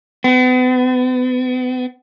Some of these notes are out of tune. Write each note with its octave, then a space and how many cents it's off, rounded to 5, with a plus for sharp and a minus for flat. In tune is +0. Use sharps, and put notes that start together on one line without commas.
B3 +40